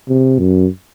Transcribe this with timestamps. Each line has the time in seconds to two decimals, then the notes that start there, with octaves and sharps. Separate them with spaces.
0.08 C3
0.39 F#2